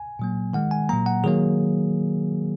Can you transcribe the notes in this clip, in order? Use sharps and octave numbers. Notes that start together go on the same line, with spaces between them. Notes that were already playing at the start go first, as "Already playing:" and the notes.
Already playing: G#5
A#2 F#3 A#3
D#3 G#3 F#5
G#5
A#2 F#3 A#3 A#5
F#5
D#3 F#3 A#3 G#4